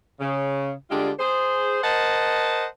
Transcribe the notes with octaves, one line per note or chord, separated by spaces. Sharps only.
C#3
D3 G3 G#3 D4 F4 G4
G#4 C5
A#4 C5 D#5 F#5 A5